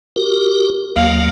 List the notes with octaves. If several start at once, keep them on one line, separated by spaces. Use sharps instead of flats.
F#4 G4 A#4
D#2 F#3 A#3 F5